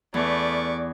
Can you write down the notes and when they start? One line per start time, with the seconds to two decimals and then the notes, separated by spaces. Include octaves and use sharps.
0.14 E2 A3 B4 D5 C#6